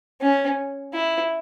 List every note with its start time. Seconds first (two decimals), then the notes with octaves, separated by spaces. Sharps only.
0.21 C#4
0.94 E4